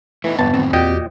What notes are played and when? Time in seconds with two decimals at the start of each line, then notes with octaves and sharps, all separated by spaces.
0.24 E3 A3 B3 D#4
0.39 G1 F2 G#2 C3 B3 B4 A5
0.54 F#2 A2 D#3 C4
0.73 E2 A#2 F#4 G4 D#5 G5